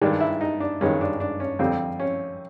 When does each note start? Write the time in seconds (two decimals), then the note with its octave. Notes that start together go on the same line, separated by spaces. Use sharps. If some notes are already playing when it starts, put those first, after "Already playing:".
0.02 G2 D#3 G#3 D4
0.20 E4
0.41 D#4
0.60 D4
0.81 G2 D#3 G#3 C#4
1.01 D4
1.20 D4
1.40 C#4
1.59 F2 D3 G3 C4
2.00 C#4